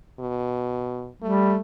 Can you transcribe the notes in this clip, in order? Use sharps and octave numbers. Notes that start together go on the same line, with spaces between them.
B2
G3 A3